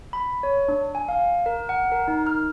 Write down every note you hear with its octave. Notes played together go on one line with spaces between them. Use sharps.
B5
C#5
D4
G#5
F5
A#4
F#5
A#4
D#4
F6